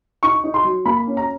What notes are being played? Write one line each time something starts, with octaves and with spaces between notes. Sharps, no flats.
D#4 C#6
D#4
C6
F#3
A#3 B5
C#4
A#5